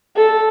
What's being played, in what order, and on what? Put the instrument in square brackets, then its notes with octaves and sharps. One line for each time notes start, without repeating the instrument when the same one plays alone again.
[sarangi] A4